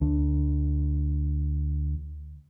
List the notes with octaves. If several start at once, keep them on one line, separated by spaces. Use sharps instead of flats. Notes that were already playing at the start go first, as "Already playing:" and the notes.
D2 D4